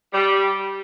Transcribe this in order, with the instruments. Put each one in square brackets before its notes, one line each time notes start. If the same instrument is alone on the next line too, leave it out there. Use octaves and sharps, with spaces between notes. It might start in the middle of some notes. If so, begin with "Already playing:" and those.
[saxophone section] G3